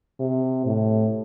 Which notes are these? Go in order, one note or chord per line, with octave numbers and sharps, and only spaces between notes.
C3
A2